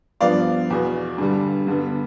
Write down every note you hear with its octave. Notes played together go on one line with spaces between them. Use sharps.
G2 F3 B3 D5 F5
E2 B2 B3
G2 D3 G3
G2 D3 G3 B3